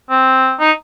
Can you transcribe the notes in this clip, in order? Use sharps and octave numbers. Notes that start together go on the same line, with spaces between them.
C4
D#4